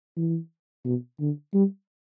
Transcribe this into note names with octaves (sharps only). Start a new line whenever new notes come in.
E3
B2
D3
G3